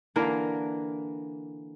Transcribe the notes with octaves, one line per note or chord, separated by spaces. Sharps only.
D3 E3 A#3 A#4